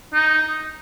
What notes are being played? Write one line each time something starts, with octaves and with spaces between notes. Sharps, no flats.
D#4